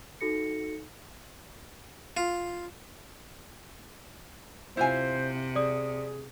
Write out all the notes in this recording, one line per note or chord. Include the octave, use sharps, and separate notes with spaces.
D#4 F#4 A4 A#6 C#7
F4
C3 E4 F4 C5 G#5
G#4 D5 D#6